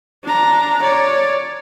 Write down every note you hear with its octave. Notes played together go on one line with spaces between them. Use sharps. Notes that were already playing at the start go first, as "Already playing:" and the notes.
D4 A#5
C#5 D5